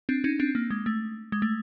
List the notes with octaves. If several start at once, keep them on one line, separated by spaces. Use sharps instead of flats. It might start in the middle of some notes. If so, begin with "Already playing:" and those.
C4 D4
C#4 D#4
C4 D4
A#3
G#3
A3
G#3
A3